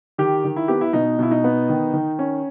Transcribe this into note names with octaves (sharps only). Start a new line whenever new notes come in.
D#3 G4
D#3
E4
B3 G4
E4
B2 D#4
B2 E4
D#4
B3
D#3
D#3
C#4